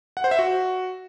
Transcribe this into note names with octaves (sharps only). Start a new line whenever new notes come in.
F#5
C5
E5
F#4